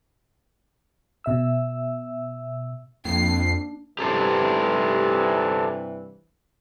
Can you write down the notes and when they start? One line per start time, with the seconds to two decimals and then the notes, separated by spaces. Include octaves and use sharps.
1.24 B2 E5 E6
3.05 F2 A#3 D4 C7
3.99 G2 C3 E3 G4 A4 C5